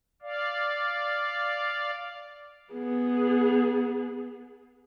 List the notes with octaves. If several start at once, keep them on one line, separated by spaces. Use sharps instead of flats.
D5 F5
B3 G#4